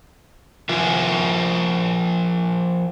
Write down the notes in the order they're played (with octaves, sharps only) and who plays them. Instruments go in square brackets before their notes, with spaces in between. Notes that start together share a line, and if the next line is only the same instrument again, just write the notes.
[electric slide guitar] F3 F4 A#4 E5